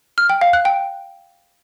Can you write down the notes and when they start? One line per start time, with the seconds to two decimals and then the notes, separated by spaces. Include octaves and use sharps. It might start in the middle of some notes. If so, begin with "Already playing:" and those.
0.18 F6
0.30 G5
0.41 F5
0.53 F#6
0.65 G5